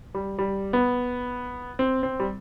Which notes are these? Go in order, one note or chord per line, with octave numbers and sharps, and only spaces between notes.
G3
G3
B3
C4
C4
G3